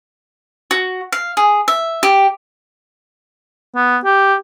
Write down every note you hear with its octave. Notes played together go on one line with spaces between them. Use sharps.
F#4
F5
G#4
E5
G4
B3
G4